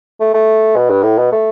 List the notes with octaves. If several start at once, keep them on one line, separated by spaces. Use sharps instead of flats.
A3
A3
B2
G2
A2
B2
A3